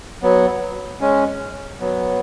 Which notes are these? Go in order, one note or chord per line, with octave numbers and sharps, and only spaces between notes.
F#3 B3
G#3 C#4
F#3 B3